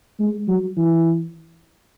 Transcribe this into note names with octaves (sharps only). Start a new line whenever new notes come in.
G#3
F#3
E3